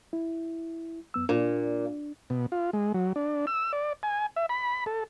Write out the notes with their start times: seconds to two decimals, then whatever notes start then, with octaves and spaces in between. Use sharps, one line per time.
0.13 E4
1.14 F#2 B3 E6
1.29 A#2 D4
2.30 B2
2.52 F4
2.73 G#3
2.94 F#3
3.16 D4
3.47 E6
3.73 D5
4.03 G#5
4.36 E5
4.49 B5
4.86 A4